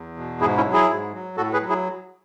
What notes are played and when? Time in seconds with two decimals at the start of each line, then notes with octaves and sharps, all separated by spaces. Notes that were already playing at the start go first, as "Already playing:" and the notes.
Already playing: E2
0.17 B2
0.41 G#2 E4 G#4
0.57 C#4 E4
0.65 F#3
0.73 E4 G#4
0.89 G#2
1.13 F#3
1.37 A2 F#4 A4
1.53 G#4 B4
1.61 F#3
1.69 E4 G#4